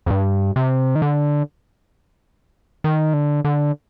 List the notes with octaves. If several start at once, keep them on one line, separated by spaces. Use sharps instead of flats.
F2
G2
C3
D#3
D3
D#3
D3
D3